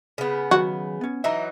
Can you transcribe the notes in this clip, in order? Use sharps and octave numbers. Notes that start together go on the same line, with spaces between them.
C#3 B3
D#3 F#3 F#4
B3 C#4
E3 F#3 D#4 E5 A#5